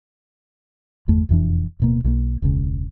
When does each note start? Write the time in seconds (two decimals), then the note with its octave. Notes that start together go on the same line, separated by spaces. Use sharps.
1.08 G1 E2 A3
1.29 E1 F2 E3 D4
1.80 D1 B2 A#3
2.04 B1 G#3 A#3
2.42 E1 C#2 C#3